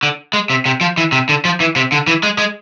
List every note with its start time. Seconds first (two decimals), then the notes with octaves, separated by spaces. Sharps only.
0.03 D3
0.33 G#3
0.50 C3
0.66 C3
0.81 F3
0.97 E3
1.12 C3
1.29 D3
1.45 F3
1.60 E3
1.76 C3
1.92 D3
2.07 E3
2.23 G#3
2.38 G#3